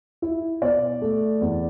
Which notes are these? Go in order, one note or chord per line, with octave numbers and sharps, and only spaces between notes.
E4
B2 D5
A3
E2